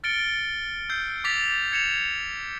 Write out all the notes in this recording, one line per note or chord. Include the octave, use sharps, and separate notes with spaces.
F6 A6 C#7 D7 G7
E6 G6 C7
D6 A6 B6 F7
G#6 C#7 E7 F7